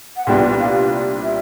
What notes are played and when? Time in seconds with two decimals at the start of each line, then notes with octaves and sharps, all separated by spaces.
0.17 F#5
0.27 C2 A#2 G3 B3 D4 G5
0.60 F5
1.23 E5